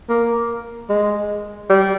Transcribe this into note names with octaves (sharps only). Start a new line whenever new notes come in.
A#3
G#3
G3